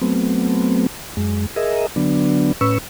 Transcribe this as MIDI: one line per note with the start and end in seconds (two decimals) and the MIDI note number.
0.02 0.86 54
0.02 0.86 57
0.02 0.86 59
0.02 0.86 60
1.17 1.46 42
1.17 1.46 56
1.56 1.87 68
1.56 1.87 70
1.56 1.87 75
1.56 1.87 76
1.96 2.52 50
1.96 2.52 54
1.96 2.52 59
1.96 2.52 62
2.61 2.78 45
2.61 2.78 61
2.61 2.78 71
2.61 2.78 85
2.61 2.78 88